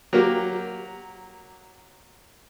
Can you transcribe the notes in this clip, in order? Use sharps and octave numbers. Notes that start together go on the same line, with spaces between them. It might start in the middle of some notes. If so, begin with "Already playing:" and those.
F#3 A#3 G4